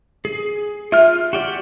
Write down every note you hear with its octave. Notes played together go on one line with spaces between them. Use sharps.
G#4
F4 E5 F6
F#4 G4 D5